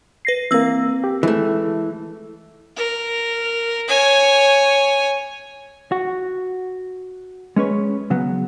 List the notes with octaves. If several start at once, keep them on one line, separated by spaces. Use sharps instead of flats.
B4 A#6 C7
E3 A#3 C4 E6
G4
E3 G#3 A3
A#4
C#5 G#5
F#4
G#3 C#4 B4 C#5
C#3 F#3 B3